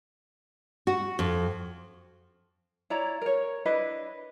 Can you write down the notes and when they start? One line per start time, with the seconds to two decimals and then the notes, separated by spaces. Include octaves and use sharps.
0.87 F#4
1.19 F2
2.90 E4 C#5 D5 A#5
3.22 A#4 C#5
3.65 D4 E4 B4 D#5